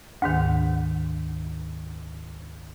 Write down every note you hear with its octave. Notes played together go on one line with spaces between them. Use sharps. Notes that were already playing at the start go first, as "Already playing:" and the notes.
D2 G#2 D#3